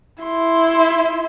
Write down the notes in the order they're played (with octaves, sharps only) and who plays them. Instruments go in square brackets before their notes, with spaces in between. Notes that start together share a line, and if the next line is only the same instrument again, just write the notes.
[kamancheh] E4 C6